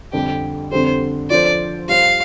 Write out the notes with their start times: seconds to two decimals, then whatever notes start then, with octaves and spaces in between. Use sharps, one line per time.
0.13 F2 D3 G3 G4
0.71 F2 D3 G3 C4 A4 C5
1.30 F3 D4 F4 A4 C5 D5
1.88 G3 F4 C5 F5